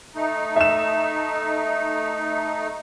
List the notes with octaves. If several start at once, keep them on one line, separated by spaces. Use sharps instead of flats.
A3 D#4
E5 E7